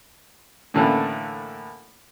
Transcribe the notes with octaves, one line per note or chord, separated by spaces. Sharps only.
A2 D3 E3 A3 A#3